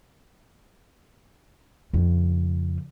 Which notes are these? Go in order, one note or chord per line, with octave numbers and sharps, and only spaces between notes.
F2 C#3